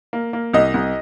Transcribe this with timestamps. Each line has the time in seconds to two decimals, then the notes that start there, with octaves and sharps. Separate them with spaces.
0.13 A#3
0.33 A#3
0.53 C2 D#5
0.74 C2